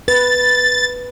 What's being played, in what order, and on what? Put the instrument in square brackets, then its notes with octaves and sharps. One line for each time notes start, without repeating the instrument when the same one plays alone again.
[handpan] B4 [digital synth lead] A6